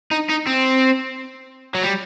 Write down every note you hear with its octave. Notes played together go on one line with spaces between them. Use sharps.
D#4
D#4
C4
F#3
G3